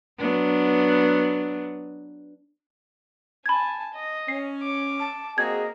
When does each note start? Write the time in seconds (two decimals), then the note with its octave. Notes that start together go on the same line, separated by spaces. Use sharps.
0.19 F#3 B3 D4
3.46 G#5 A5 B5 G#6
3.94 D#5
4.28 C#4 C7
4.62 D6
5.00 A5
5.38 A#3 C4 F#4 G#4 D#5 G#6